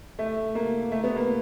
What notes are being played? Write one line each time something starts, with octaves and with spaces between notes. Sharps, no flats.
A3
A#3
A3
B3
A#3